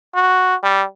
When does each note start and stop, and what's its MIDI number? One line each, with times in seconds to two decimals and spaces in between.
0.15 0.55 66
0.63 0.84 55